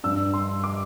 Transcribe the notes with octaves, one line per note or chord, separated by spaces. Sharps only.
G2 G3 D4 E6
C6
D6